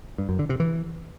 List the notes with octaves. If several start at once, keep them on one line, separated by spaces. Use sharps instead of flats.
G2
F#2
D3
C3
E3